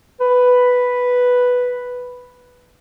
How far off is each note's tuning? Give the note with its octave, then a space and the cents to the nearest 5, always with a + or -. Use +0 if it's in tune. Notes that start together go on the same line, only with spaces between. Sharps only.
B4 +0